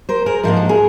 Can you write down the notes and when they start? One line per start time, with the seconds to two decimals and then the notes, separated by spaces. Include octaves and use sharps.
0.09 A#4 C5
0.26 G#4 A#4
0.43 G#2 F3 A#3 D4 A#4
0.57 A4
0.69 G#4 A#4